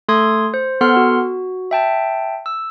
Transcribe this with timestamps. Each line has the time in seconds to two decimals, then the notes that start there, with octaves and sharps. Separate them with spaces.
0.08 A3 A4 C6 D#6 G#6
0.54 C5
0.81 B3 A4 F#5 C6 F6
0.96 F#4
1.71 E5 G5 A5
2.46 E6